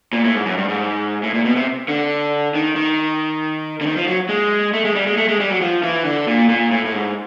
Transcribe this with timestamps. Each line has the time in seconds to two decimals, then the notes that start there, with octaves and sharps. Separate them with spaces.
0.13 A#2
0.24 A2
0.36 G#2
0.46 F#2
0.57 G2
0.68 G#2
1.23 A2
1.34 A#2
1.45 B2
1.56 C3
1.88 D3
2.55 D#3
2.76 D#3
3.81 D3
3.86 D#3
3.96 F3
4.07 F#3
4.29 G#3
4.73 A3
4.85 G#3
4.95 G3
5.07 G#3
5.17 A3
5.28 G#3
5.40 G3
5.50 F#3
5.61 F3
5.83 E3
6.05 D3
6.27 A#2
6.49 A#2
6.71 A2
6.85 A2
6.93 G#2